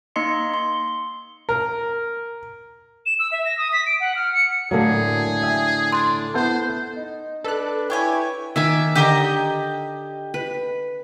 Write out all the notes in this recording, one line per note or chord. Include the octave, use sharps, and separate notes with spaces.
A#3 D#4 D#5 C6 C#7
C6
A#4
E7
E6
E5
A#6
D#6
B6
D7
F#5
F6
C#7
A2 D3 F#3 A#3 G#4 A4
E5 G5 G#5
D4 C6
B3 E4 A4 C5
D#4
D4 A4 B4 F#6
E4 G4 C#5 G#5
D#3 E5 G#5 D6
D3 G4 D#5 A#5
B4